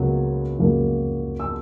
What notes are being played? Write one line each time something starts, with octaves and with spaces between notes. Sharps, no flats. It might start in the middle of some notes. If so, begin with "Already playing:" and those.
Already playing: C#2 C#3 F#3 A#3
C#2 C#3 F#3 A#3
E6